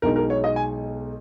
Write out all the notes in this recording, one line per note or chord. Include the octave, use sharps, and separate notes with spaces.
B1 B2 G#3 D#4 A#4
A#4
C#5
D#5
G#5